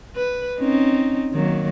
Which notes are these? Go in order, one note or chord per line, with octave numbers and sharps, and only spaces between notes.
B4
C4 C#4 D#4
D#3 F#3 A#3